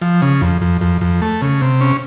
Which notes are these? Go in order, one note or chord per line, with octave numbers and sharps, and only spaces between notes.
F3
C#3
F2
F2
F2
F2
A3
C#3
C3
C#4